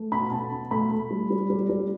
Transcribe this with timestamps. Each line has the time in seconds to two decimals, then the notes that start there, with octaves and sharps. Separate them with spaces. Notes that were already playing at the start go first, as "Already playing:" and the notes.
Already playing: A3
0.12 B2 B5
0.31 B2 A5
0.52 B2
0.71 A3 B5
0.91 A3
1.11 G3
1.30 G3
1.50 G3
1.69 G3